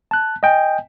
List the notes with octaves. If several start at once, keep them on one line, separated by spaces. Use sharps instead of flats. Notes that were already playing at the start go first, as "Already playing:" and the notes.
A5 F#6
D#5 G5 G#5